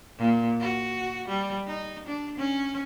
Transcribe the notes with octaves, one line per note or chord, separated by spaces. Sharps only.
A#2
F#4
G3
D#4
D4
C#4